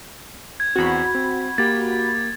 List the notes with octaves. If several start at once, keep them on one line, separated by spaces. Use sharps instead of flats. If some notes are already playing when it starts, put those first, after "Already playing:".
G#6
E2 C4 F#4 B5
C4
A#3 G4 A6